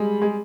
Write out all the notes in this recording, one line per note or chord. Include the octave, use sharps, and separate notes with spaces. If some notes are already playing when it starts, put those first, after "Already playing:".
Already playing: G3 G#3
G#3